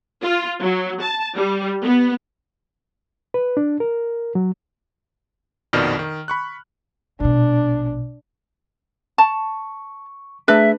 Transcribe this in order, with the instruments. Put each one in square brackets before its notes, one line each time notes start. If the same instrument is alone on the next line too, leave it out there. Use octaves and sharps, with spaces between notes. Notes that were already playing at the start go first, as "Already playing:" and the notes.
[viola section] F4
F#3
A5
G3
B3
[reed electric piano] B4
D4
A#4
F#3
[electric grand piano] A#1 F2 B2 D#3 D5 F6
D#3
B5 C#6 F#6
[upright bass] A#1 B2 [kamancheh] D4
[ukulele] A5 [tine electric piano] C#6
[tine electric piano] A3 G#4 [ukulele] D4 B4 [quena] E5